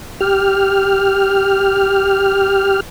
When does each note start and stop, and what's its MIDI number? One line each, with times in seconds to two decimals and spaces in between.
0.21 2.80 67
0.21 2.80 89